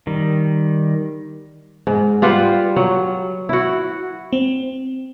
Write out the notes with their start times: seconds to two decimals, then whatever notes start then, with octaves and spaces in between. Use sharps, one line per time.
0.07 D#3 G3
1.87 G#2
2.22 G3 F4 B4 F#5
2.76 F#3
3.49 E4 F#4
4.33 C4